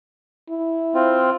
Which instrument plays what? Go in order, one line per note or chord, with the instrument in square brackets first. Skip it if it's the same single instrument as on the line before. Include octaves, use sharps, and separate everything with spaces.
[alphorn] E4
[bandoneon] C4 F4